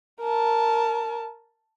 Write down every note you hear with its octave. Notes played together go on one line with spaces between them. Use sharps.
A#4 A5